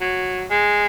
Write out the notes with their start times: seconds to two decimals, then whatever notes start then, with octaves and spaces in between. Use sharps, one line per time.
0.01 F#3
0.50 G#3